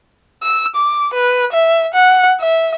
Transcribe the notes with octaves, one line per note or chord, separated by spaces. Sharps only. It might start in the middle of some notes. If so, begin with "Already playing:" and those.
E6
D6
B4
E5
F#5
E5